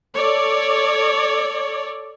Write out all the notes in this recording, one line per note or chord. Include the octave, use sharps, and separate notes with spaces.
A4 C#5 D5